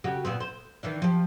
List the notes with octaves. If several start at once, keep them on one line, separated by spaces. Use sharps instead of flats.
C#3 F#4 G4
A#2 B3 C4
C5
D#3 E3 D4
F3 G4